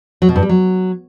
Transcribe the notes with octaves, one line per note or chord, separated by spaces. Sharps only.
F#3
B2
G2
G3
F#3